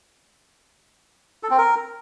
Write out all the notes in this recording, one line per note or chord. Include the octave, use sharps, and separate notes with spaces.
A4
C4
A#4